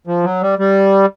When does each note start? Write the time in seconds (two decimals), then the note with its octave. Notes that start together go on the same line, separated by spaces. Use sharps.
0.07 F3
0.24 F#3
0.42 G3
0.59 G3